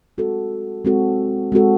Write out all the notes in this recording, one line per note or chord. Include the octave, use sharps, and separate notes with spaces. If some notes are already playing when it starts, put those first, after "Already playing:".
G#3 C4 F#4 A4
G#3 C4 F#4 A4
G#3 C4 F#4 A4